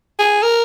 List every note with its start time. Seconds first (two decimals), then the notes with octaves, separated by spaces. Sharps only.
0.19 G#4
0.43 A#4